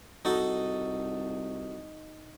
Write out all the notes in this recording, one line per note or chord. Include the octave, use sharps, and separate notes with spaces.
C2 D#4 F#4 A4